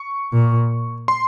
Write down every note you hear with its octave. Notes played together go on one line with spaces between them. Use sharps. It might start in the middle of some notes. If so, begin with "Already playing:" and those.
Already playing: C#6
A#2
C6